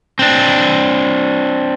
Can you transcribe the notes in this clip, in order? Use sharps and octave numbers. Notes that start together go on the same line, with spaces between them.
C4 D4